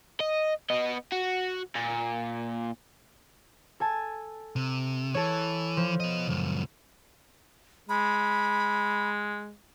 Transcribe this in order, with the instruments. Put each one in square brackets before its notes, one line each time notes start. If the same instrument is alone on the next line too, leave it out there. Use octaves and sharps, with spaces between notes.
[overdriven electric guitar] D#5
B3 D#5
F#4
A#2
[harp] A4 G#5 A5
[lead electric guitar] C3
[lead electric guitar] E3 [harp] A4 C#5
[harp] F3
[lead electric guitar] B3 D#5
C#2 F#2
[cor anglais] G#3 [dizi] B5